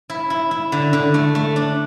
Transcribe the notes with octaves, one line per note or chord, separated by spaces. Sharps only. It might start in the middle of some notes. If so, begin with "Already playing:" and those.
E4
E4
E4
D3
D3
A3
A3
D4